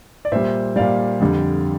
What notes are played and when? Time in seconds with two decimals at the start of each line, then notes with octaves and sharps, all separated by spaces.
0.25 D5
0.32 A#2 G3 C5 E5
0.76 A#2 G3 D5 F5
1.20 F2 D3 G3